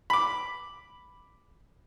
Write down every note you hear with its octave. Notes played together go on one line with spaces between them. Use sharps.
B5 D6